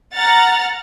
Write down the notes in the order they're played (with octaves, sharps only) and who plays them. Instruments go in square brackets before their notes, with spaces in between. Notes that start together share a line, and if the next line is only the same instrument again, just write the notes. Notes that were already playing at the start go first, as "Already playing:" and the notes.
[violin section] F#5 A#5 F6 A6